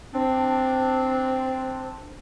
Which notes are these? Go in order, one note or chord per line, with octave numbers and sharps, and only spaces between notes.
C4 D4